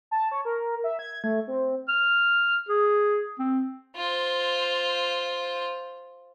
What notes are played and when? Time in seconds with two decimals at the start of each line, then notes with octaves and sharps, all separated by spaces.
0.11 A5
0.31 C#5
0.45 A#4
0.84 E5
0.99 G#6
1.24 A3
1.47 C4
1.88 F6
2.69 G#4
3.39 C4
3.96 F4 C5